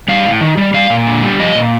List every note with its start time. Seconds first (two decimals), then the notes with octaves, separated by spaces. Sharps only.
0.08 G3 F5
0.25 A2
0.41 D#3
0.57 G3
0.74 G3 F5
0.90 A#2
1.06 D3
1.23 G3
1.40 F3 D#5
1.55 A#2